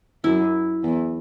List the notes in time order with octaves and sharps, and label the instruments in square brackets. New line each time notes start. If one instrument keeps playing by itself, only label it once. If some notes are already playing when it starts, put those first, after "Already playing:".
[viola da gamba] F#2 [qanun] E4
[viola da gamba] E2